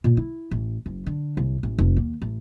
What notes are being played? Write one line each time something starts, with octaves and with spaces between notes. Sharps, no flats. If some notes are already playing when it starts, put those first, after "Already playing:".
A#2
E4
A1
F#1
D3
C2
A1
F1
D#2
A1